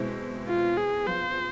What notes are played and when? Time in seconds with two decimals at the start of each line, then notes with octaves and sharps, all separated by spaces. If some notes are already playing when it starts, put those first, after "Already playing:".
Already playing: B2 G#3 C4 E4
0.48 F4
0.77 G#4
1.07 F3 B3 F4 G#4 C5